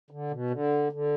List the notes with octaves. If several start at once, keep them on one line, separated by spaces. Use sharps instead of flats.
D3
B2
D3
D3